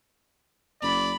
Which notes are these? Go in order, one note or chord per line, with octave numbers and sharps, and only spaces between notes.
F#1 D5 B5